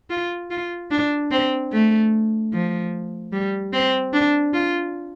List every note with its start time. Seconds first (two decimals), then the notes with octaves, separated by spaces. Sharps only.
0.10 F4
0.50 F4
0.91 D4
1.31 C4
1.72 A3
2.53 F3
3.33 G3
3.73 C4
4.13 D4
4.54 F4